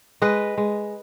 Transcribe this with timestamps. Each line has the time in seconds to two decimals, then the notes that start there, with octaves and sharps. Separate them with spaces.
0.22 G#3 B4 D#5
0.57 G#3